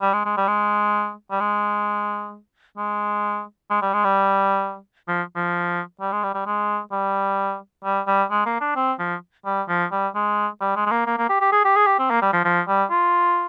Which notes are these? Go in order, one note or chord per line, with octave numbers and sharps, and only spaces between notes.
G3
G#3
G#3
G3
G#3
G3
G#3
G#3
G#3
G3
G#3
G3
F3
F3
G3
G#3
G3
G3
G#3
G3
G3
G3
G#3
A#3
D4
C4
F3
G3
F3
G3
G#3
G3
G#3
G#3
A#3
A#3
A#3
G4
G4
G#4
G4
G#4
G4
C4
A#3
G3
F3
F3
G3
F4